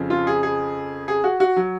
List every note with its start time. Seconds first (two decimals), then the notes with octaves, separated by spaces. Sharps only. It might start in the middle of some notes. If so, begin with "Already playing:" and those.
Already playing: F2 C#3 F3
0.10 F4
0.27 G#4
0.43 G#4
1.08 G#4
1.24 F#4
1.40 F#4
1.56 F#3